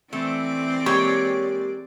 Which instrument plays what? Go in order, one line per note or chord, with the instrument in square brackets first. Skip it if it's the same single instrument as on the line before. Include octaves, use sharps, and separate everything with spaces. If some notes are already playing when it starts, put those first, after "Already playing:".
[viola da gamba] E3 C4 D5 [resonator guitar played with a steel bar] A3
[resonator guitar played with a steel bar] G#3 A#3 G4 [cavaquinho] C#5